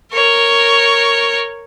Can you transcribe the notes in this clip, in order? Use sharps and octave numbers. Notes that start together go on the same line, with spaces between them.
A#4 C#5